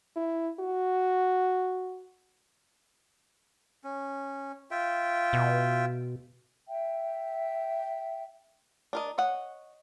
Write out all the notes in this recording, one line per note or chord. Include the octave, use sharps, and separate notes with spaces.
E4
F#4
C#4
F4 E5 G5
B2
E5 G5
D4 A#4 D#5
C#5 D#5 F#5